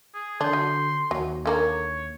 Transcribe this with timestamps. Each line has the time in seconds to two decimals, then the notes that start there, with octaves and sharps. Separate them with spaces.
0.14 G#4
0.41 D3 D4 C6 G6
0.53 F#3
1.11 D#2 F#3
1.46 D3 A#3 A#4 C#5